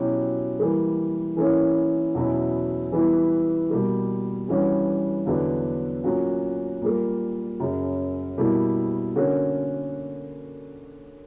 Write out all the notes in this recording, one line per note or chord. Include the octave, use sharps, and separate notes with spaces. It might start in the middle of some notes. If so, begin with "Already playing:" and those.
Already playing: B2 F#3 C#4 E4 G4
E3 G3 A#3
E3 A#3 C#4 E4
E2 B2 F#3 C#4 E4
E3 G3 B3 E4
B2 G3 A#3
G2 E3 G3 C#4 F#4
E2 D3 F#3 B3 D4
A#2 F#3 C#4 F#4
A#2 G3 A#3
F#2 C#3 F#3
B2 G3 A#3 E4
D3 A#3 C#4 F#4